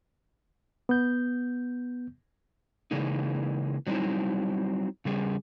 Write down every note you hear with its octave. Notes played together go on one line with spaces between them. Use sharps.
B3 G6
C#3 E3 G#3 A#3 D#4
F#3 G3 C4 D#4 E4
C#3 G3 G#4